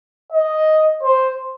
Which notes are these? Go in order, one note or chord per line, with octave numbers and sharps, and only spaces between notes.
D#5
C5